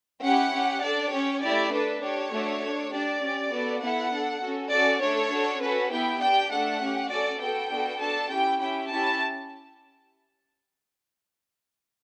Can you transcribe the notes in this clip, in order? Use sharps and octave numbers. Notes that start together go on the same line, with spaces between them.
C#4 E4 G4 F#5
C#4 G4
D4 A4 D5
C#4 G4 C#5
A3 E4 G4 D5
D4 A4 B4
D4 G4 C#5
A3 D4 F#4 A4
D4 A4
D4 G4 D5
C#4 G4
B3 F#4 A4
B3 E4 A4 F#5
D4 A4
C#4 F#4 A4
C#4 F#4 A4 D5
A3 D4 A4 C#5
D4 F#4 A4
C#4 F#4 A4 B4
B3 E4 G4 G5
D4 G4 G5
A3 D4 A4 F#5
C#4 G4
C#4 F#4 A4 D5
B3 F#4 A4 G5
B3 D4 F#4 A4
D4 F#4 A4 A5
C#4 E4 G4 G5
C#4 E4 G4 G5
C#4 E4 G4 A5